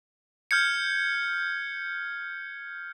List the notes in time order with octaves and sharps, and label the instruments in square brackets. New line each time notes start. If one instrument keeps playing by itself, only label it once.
[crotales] F6 G6 G#6 C#7